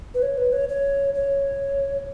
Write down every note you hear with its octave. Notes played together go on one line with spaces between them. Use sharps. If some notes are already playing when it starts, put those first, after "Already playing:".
B4
C#5
B4
C#5
C#5
C#5